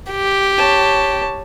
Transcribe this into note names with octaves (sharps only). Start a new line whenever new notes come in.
G4
C#5 A5